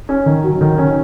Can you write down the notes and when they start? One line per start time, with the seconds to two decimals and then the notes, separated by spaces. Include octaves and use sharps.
0.09 C#4
0.26 D#3
0.44 F#3
0.61 D#3
0.78 C#4